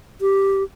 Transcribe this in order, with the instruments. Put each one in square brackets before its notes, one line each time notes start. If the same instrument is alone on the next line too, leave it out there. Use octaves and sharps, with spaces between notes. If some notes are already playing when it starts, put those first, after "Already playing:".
[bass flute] G4